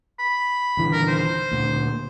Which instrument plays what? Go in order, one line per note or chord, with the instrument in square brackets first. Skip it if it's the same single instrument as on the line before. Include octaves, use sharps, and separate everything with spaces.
[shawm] B5
[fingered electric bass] D#1 D3 E3
[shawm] A#4
C5
[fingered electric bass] D2 A#2